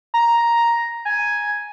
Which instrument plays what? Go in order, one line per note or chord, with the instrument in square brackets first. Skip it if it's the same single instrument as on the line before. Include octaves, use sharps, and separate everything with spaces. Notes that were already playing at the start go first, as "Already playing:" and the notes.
[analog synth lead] A#5
G#5